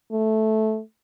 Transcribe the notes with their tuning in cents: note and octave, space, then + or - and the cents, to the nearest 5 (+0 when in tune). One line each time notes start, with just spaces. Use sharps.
A3 -10